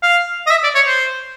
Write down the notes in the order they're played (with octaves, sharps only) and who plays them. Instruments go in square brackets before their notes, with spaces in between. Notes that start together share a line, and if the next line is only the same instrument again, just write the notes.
[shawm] F5
D#5
E5
D5
C#5
C5